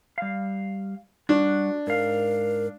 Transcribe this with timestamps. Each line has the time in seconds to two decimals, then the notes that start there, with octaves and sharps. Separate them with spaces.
0.18 G3 F5
1.29 G3 D4 F#4
1.87 G#2 A#4 F5